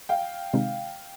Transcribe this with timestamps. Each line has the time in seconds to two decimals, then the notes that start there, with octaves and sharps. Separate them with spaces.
0.09 F5 G5
0.53 C3 D#3 G#3 C4 D#4